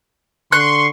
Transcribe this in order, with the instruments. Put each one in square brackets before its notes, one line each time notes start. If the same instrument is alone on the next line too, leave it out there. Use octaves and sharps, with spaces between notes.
[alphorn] D3 [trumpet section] C6 [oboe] C#6 [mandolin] F#6